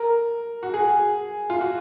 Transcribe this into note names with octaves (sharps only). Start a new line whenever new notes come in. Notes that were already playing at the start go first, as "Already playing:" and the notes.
Already playing: A#4
F#4
G#4
F4
F#4